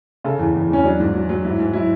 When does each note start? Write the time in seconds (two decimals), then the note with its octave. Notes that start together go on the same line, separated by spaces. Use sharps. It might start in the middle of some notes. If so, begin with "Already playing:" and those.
0.24 C#3 A4
0.39 E2
0.54 E2
0.69 E2 C#4
0.84 F#3 D4
1.00 G#2
1.14 F#3
1.29 F#3
1.44 G#2 E4
1.59 G#2
1.73 F#3 E4